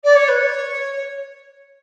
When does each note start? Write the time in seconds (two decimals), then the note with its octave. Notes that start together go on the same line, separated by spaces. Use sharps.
0.04 D5
0.15 C#5
0.28 B4
0.40 D5
0.44 C#5